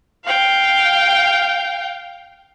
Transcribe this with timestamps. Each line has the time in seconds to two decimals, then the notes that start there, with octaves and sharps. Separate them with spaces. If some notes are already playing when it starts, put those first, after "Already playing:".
0.25 F5 G5